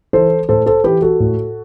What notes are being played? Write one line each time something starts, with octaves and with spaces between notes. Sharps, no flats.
E3 A4 C5
A2 A4 C5
A4 C5
E3 G4 B4
F#4 A4
A2